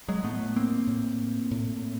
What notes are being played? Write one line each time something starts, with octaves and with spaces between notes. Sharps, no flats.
F#3 G#3
A2 A3 B3
A#3 C4
A2
A2